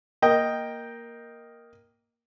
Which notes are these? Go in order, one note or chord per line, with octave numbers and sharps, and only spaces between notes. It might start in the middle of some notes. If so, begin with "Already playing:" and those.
A#3 D#5 G5